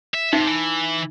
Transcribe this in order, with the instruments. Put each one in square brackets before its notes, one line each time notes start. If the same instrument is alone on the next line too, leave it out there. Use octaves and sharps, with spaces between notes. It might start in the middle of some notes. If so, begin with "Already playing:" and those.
[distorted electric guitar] E5
[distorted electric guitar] C3 [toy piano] D#4
[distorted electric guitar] E3